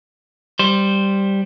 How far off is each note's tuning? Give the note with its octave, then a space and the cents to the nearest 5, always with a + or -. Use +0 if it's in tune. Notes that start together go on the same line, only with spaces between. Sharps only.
G3 +0 C5 +0